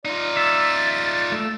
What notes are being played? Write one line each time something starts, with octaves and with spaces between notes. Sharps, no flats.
D#4 F4 D5
E5 A6
A3